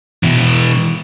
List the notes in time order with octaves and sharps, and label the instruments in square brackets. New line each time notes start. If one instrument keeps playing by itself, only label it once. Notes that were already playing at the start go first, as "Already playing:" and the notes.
[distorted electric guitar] B2 E3